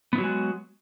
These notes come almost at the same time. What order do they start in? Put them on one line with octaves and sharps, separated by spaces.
B3 D#4 F#3 F#4 G#3